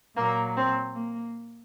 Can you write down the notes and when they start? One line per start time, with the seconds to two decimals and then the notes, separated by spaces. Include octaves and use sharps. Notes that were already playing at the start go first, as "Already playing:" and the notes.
0.16 A#2 F#3 A#3
0.55 C4
0.96 A#3